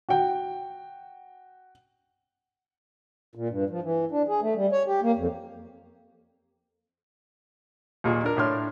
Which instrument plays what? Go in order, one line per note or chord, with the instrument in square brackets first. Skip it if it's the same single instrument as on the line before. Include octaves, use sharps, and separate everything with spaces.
[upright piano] F#4 G5
[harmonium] A#2
G2
F3
E3
D4
G#4
A3
G3
C#5
G4
A#3
F2
[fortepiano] D#2 A#2 G#4
D4 A#4
A2 D4 C#5 C6 F6